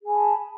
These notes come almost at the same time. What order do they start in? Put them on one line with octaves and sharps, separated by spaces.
G#4 G#5 B5 A5